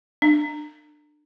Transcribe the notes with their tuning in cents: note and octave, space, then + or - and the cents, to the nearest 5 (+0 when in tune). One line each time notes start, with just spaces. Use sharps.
D4 +30